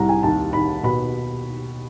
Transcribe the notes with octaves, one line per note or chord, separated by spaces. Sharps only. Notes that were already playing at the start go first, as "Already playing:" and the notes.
Already playing: C2 A2 A#5
G#5
D#2 A5
D#2 B5
B2 B5